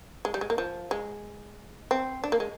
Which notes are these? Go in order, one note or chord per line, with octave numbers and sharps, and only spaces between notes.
G#3
G3
G#3
A#3
F3
G#3
C4
D4
A#3
G#3